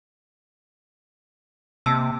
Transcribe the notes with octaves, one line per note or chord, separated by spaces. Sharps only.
C3 A#3 A5 E6